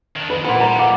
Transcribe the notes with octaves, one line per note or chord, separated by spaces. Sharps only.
D#3 D4
F2 D#3 B4
A#2 E3 B3 C5 B5
G3 A#5
F2 A2 F5 F#5 D6